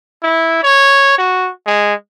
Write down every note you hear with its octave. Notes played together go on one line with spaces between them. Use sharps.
E4
C#5
F#4
G#3